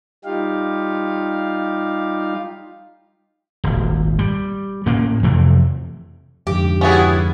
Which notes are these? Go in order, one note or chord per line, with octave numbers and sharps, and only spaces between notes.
G3 D#4 F4 G4 F5
D#1 G#1
G3
A2 A#3 C#4
F2 C3 E3 A3
F2 G#2 D3 G4
B3 C#4 E4 F#4 G#4